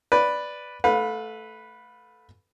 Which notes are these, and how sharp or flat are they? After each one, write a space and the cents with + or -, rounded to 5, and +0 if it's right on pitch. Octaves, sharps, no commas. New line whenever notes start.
B4 +0 D5 +0
A3 -5 B4 +0 F5 +40